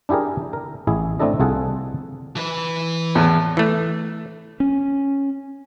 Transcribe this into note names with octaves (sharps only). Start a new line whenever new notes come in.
D4 E4 G4 G#4 A#4
A#4
A1 E4 G#4
A3 C4 D4 E4 A4 D#5
C2 F4 G#4 A4 F#5
E3 B4
E2 A2
E3 A3
C#4